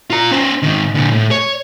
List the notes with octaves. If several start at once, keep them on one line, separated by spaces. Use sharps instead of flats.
F4 A#5
C#4 C5
G#2 D#3
A#2 D3
A2
C#5